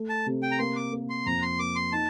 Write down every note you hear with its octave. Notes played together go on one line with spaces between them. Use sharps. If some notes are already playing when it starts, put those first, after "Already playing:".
Already playing: A3
A5
C3
G5
A#5
A#3 C6
D6
A#3
C6
F2 A#5
C6
A#3 D6
C6
D#4 A5